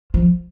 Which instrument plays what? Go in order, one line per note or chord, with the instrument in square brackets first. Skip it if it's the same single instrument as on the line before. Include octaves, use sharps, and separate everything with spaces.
[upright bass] F3